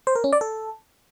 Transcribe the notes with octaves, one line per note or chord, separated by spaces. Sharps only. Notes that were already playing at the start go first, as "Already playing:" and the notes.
C5
A#4
C#4
D5
A4